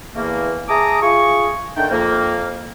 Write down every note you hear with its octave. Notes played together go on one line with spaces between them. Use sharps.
E2 E3 A3 A#3
G#4 E5 A5 A#5 D6 D#6
F4 G#4 C#6
D3 D#3 A3 D4 D#4 G5
F2 A#3